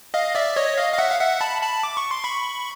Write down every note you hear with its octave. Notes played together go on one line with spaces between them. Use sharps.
D#5 F5
D5 E5
C#5 D#5
D#5 F5
F5
E5 F#5
F5
E5 F#5
A5 B5
A5 B5
D6
C#6
C6
B5 C#6